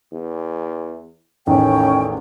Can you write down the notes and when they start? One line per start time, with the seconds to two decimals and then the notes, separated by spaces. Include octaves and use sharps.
0.12 E2
1.47 A1 E2 A2 D#3 C#4 G5